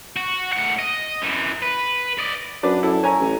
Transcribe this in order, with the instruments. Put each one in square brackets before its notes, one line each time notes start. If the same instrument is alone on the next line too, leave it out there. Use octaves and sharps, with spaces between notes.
[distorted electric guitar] F#4
A2 F#5
D#5
F#2 E3
B4
D5 D#5
[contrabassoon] F#2 [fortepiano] D4 B4 D5
[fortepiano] E4 A4
C#4 G#5 A#5
[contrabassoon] A1